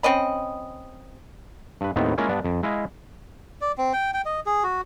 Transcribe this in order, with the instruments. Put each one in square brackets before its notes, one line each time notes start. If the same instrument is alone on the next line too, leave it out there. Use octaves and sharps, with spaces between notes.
[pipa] C4 C#4 D#5 B5
[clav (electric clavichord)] G2 B4
D#2 A2 D#3 B3 C4
G#3 A#3 C#4 E4 F4
G2 B3 D4
F2
G#3 E4 D#5 F5
[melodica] D5
C4
G5
G5
D#5
G#4
F#4